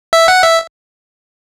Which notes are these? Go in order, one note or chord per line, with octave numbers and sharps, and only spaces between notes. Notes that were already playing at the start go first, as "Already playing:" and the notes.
E5
F#5
E5